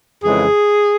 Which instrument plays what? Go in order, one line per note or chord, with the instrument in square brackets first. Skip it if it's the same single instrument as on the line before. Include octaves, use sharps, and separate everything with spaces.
[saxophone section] F2 C#3 E3 G#3 G#4